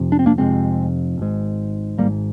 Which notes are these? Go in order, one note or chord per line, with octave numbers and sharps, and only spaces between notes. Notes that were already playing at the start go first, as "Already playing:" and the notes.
Already playing: F1 F2 C3
D4
C4
A#3 D4
F1 F2 C3 G#3 C4
G#1 G#2
G#1 G#2 G3 A#3